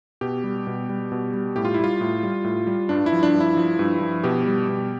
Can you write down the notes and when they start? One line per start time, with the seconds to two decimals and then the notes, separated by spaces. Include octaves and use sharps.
0.21 B2 G4
0.44 G3
0.67 B2
0.89 G3
1.12 B2
1.34 G3
1.56 A2 G4
1.65 F4
1.74 E4
1.79 G3 F4
2.01 A2
2.23 G3
2.44 A2
2.67 G3
2.89 G2 D4
3.06 E4
3.12 F3
3.23 D4
3.34 G2
3.40 E4
3.57 F3
3.79 G2
4.01 F3
4.24 B2 G4
4.46 G3
4.69 B2